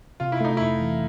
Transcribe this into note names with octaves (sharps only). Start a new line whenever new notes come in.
C3 F4
E4
A3 D#4
F2 E4
E3